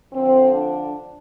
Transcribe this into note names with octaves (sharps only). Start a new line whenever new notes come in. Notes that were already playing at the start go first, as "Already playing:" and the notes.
F2 D3 F3 C4
D4